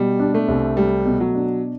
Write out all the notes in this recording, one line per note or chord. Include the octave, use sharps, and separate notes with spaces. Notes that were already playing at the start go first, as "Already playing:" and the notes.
Already playing: B2 G3
D4
A3
C2
G3 A3
B2
F#3
D4